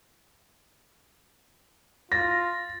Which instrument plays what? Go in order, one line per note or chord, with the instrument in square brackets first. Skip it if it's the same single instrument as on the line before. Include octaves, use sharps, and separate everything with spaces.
[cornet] F4 [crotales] A6 [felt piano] A#6